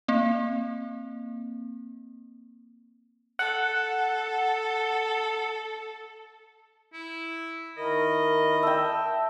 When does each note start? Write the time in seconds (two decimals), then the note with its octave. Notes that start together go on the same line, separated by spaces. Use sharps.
0.08 A#3 C4
3.39 A4 F#5
6.93 E4
7.77 D#3 E4 A#4 D#5
8.63 E5 G5 A5